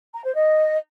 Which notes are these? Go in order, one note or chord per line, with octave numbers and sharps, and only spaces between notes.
A#5
C5
D#5